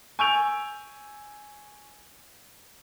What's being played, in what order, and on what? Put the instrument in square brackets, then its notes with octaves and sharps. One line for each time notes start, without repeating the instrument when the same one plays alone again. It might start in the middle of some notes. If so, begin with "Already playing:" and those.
[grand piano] G#5 C#6 E6 G6 D7 F7